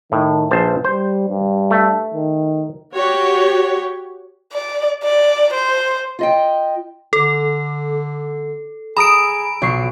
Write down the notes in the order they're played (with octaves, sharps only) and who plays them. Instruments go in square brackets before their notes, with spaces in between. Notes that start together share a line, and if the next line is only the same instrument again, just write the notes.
[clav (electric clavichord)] A2 [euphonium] D#3
[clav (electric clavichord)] A#1 C5 A5 [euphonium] B4
[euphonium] G3 [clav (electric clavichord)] C5
[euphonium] G2
[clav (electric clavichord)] A3
[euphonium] D#3
[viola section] F#4 G4 C#5
[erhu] D5
D5
C5
[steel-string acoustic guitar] F4 D#5 G5
[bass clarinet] D3 [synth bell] A4
[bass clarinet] G#4 [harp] A#5 D#6 E6 [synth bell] B5 D7
[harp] B1 C#6 C7 [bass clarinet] A#2